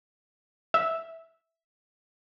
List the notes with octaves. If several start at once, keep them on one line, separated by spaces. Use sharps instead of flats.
E5